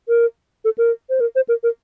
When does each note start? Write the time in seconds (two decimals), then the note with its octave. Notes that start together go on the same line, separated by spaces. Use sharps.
0.08 A#4
0.65 A4
0.78 A#4
1.10 C5
1.20 A#4
1.35 C5
1.48 A#4
1.63 A#4